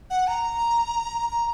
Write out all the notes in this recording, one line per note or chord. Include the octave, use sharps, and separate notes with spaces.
F#5
A#5
A#5